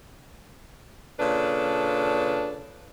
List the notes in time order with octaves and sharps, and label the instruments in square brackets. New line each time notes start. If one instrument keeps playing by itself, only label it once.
[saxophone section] A#2 C#3 D4 A4 B4